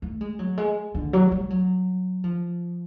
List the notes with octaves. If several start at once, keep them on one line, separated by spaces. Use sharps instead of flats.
A3
G#3
F#3
G#3
D3
F#3
G3
F#3
F3